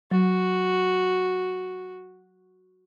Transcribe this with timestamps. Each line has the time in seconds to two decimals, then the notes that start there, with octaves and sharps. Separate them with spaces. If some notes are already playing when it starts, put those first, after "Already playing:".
0.11 F#3 F#4